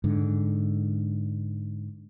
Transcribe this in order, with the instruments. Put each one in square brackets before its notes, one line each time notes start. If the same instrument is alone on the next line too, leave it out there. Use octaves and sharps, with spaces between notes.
[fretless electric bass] G#2 D3